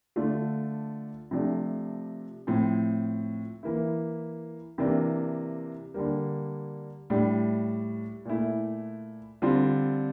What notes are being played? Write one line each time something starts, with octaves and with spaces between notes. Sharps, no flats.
D3 A3 D4 F4
C3 F3 A3 D4
A2 F3 C4
E3 A#3 E4
C3 E3 A#3 D4
D3 G3 A#3
A2 G3 D4
A#2 A3 E4
D3 G3 C4 F4